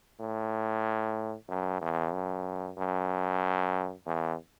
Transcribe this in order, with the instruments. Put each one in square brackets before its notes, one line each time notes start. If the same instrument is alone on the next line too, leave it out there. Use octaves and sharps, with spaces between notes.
[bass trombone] A2
F#2
E2
F#2
F#2
E2